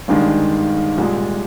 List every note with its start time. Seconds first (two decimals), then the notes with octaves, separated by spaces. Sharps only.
0.08 G1 G2 D#3 G#3 D4
0.98 C2 A#2 G#3